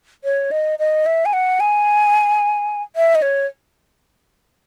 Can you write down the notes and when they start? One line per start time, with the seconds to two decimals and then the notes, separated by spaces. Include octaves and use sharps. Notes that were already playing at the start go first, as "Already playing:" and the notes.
0.24 C#5
0.51 D#5
0.79 D#5
1.06 E5
1.25 G#5
1.33 F#5
1.60 G#5
2.96 E5
3.15 D#5
3.22 C#5